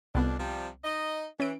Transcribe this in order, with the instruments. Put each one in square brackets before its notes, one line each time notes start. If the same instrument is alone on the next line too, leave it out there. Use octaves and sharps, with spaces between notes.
[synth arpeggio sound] C2 B3 [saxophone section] F2 D4
[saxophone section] C3 F3 G3
D#4 D#5
[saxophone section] E3 [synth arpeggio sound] C#4 D7